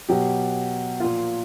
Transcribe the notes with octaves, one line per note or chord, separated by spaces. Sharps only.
B2 F#3 G4
A#2 F3 F4